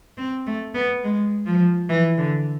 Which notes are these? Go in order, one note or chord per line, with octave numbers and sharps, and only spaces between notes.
C4
A3
B3
G#3
F3
E3
D3